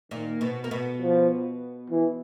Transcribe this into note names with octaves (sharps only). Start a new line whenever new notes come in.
A#2 D#3 A#3
B2 B3
A#3
B2 B3
F3
E3